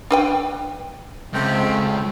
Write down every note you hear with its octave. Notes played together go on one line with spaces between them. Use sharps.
D4 B4 G5
C#2 C3 A3 C4